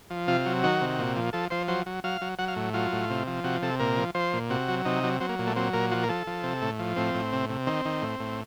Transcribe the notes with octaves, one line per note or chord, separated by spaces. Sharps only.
F3
C3 F4
F#3
D#3 F#4
C3
A#2
F3
F3 A4
F3 C5
F#3 C5
F#3
F#3 F5
F#3
F#3 F#5
F5
A2
F#3 F4
A2
C3
F3
C3 F#4
C3 A4
A#2 A#4
F3
F3 C5
A#2
C3 F#4
F#3
C3 D#4
F#3
F#3 C4
A#3
A#2
A3
F#3 C4
A#2 A#4
F3 F#4
A#4
F3 A4
F3
C3
A2
F3
A2 C4
A2
C3
C3
D#3 C4
D#3
A2
A2